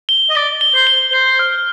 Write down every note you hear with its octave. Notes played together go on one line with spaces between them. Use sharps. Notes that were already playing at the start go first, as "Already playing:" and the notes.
G7
D#5
D5 G7
G7
C5
G7
C5 G7
F6